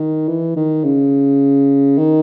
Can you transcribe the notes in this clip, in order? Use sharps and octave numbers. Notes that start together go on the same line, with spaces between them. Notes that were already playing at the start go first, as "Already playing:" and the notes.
Already playing: D#3
E3
D#3
C#3
D#3